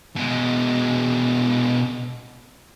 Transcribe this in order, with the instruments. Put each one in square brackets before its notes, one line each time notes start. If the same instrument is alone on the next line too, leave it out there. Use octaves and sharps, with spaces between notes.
[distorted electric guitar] B2 G#3